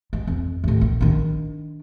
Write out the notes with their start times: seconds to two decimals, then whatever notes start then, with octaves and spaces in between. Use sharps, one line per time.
0.13 G#3
0.27 F2
0.64 D#2 A2
0.81 A#1
1.01 D#3 D4